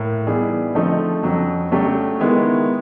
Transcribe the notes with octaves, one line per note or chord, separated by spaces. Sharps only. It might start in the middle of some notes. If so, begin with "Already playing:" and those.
Already playing: A2 A#3
E3 G3 B3 D#4 G#4
D3 F3 A3 C4 D#4
F2 C#3 F#3
C#3 F#3 A3 D4 G4
D#3 G#3 B3 E4